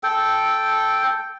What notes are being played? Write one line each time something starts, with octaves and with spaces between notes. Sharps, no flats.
A4 G5